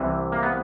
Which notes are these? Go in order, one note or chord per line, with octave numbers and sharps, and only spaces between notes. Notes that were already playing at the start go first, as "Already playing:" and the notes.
Already playing: C2 C3 E3
A#3
B3